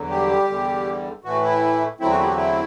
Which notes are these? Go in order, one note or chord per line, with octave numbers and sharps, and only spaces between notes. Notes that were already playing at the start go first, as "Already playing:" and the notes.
Already playing: E2 D3 F#3
G3 G4
E2 D3 G3
A2 E3 A3 F#4
E4
E2 D3 F#3 A3 C4 E4
F#4
E4
G4
F#4
E4